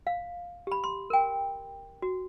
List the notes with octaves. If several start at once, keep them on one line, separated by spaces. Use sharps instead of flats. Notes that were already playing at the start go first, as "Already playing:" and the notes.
F5
G4 B5
C6
A#4 G5
F#4